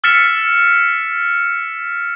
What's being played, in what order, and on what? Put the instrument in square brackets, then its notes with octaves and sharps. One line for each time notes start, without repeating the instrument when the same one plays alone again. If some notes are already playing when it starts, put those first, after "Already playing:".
[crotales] E6 F6 A6 B6 C#7 E7